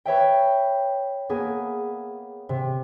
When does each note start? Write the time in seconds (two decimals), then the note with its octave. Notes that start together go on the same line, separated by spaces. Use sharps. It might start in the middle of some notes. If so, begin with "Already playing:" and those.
0.05 B4 C#5 E5 G5
1.29 A#3 B3 G#4
2.49 C3